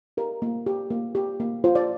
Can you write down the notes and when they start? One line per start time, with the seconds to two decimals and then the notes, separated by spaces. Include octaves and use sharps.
0.17 G4 A#4
0.42 A#3
0.66 G4
0.90 A#3
1.15 G4
1.40 A#3
1.64 F4 C5
1.75 D5